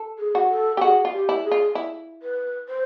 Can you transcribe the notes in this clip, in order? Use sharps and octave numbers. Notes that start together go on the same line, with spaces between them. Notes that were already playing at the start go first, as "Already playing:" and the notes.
Already playing: A4
G#4
F#4
A4
G4
F#4 G#4
F4
G4
E4
G#4
F4
E4
B4
C5